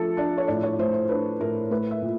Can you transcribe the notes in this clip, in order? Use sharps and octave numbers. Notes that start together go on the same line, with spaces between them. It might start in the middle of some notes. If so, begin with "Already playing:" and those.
Already playing: F3 A3 D4 A4
D4 D5
C#5
A2 D5
C#5
A2 C5
C5
D4 B4
A2 A#4
A3 B4
E5
A#2